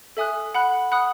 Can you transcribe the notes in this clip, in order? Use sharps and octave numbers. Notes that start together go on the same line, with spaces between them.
A4 E5 G#5 D#6 F#6
F#5 B5 F#6
F#5 B5 D#6 F#6